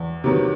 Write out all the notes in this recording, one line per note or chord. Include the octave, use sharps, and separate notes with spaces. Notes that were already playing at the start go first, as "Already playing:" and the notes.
Already playing: E2
C3 D#3 F#3 B3